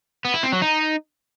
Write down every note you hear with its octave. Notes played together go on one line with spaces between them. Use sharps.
B3
E4
C4
F#3
D#4